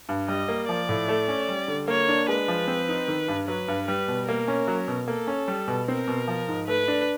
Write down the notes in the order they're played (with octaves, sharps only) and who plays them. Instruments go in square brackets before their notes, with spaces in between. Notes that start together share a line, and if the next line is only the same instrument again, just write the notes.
[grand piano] G2
[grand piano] G3 [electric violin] D#5
[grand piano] A#3
[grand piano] F3 [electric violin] D5
[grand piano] A2
A3
C#4
G3
D3
[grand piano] A#3 [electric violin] C#5
[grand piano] D4
[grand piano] G#3 [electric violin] B4
[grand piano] F3
C4
D#4
D#3
G2
[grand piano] F#3 [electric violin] B4
[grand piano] G2
[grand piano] G3 [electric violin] B4
[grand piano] B2
[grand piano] A#3 [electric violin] A#4
[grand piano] C#4
F#3
B2
[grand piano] A#3 [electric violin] A4
[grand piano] C#4
G3
B2
[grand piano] C4 [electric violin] A#4
[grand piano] B2
F3
G#2
[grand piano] A3 [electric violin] B4
[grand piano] D4